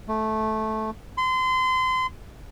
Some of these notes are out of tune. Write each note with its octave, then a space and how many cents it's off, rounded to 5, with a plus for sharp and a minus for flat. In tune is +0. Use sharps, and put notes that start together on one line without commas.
A3 -10
C6 -30